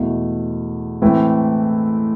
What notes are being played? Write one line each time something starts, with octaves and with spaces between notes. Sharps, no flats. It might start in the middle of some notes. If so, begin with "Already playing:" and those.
Already playing: E2 B2 A3 E4
A2 E3 A3 C4 E4